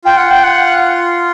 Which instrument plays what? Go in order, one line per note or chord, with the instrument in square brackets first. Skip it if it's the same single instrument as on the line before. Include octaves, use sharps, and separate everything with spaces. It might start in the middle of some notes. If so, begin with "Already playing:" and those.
[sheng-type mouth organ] F4 [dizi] G5
[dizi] F#5
G5
F#5